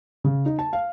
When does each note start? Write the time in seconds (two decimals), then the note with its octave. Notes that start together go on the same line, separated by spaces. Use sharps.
0.24 C#3
0.46 D#4
0.59 A5
0.73 F5